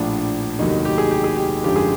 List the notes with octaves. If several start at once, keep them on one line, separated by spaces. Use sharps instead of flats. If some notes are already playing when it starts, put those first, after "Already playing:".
Already playing: A#1 A2 F3 D4
F1 D#2 D#3 F#3 D#4
G4
G#4
G4
G#4
G4
G#1 F#2 D3 F3 G4
G#4